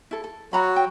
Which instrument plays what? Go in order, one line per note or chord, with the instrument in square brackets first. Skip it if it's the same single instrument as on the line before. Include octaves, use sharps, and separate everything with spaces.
[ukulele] E4 A4
A4
[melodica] F#3 F#4 [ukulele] F#5 A#5 B5
[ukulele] G5